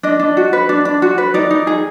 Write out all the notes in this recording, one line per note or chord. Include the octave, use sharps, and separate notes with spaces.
D4 D#5
D4
F#4
B4
D4
D4
F#4
B4
D#4 D5
D#4
G#4